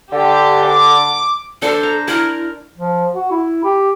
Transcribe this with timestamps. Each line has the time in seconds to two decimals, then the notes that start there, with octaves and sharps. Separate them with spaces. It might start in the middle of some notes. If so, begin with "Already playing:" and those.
0.13 D3 G4
0.72 D6
1.62 D4 A4 C5
1.83 A#5
2.08 E4 A#4
2.78 F3
3.15 F#4
3.31 E4
3.64 G4